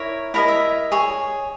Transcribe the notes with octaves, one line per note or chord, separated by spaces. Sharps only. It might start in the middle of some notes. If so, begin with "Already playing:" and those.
Already playing: E4 A#4 C#5
E4 A#4 D#5 A#5
E5
G#4 C#5